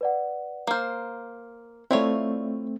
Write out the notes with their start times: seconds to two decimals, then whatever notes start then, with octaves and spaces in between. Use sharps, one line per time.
0.01 B4 D5 F#5
0.67 A#3 C5 A#5 F6
1.91 A3 C4 E4 F4 C#5 D5 E5